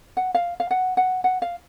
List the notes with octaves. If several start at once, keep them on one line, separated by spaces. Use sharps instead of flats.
F#5
F5
F5
F#5
F#5
F#5
F5